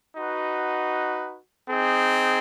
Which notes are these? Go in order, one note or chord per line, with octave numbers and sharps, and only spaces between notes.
D#4 F#4 B4
C4 D#4 G#4